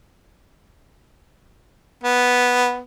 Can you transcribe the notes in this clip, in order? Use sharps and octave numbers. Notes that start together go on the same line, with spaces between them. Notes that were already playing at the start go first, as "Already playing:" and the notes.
B3